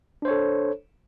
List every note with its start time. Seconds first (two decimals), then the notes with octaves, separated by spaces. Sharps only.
0.22 D4
0.25 C5
0.28 C#5
0.31 A4